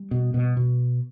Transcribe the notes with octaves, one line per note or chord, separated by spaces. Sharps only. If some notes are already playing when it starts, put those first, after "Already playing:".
Already playing: G3
B2
B2
B2